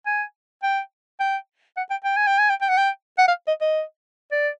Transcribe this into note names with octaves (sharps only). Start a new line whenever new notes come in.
G#5
G5
G5
F#5
G5
G5
G#5
G5
G#5
G5
G5
F#5
G5
F#5
F5
D#5
D#5
D5